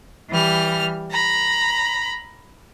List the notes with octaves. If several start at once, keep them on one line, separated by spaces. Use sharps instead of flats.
E3 G3 F6
A#5 B5